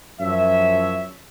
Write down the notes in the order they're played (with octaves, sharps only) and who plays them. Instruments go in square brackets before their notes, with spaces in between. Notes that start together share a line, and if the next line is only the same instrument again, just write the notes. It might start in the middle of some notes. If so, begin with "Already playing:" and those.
[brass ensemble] F#2 F3 C#5 E5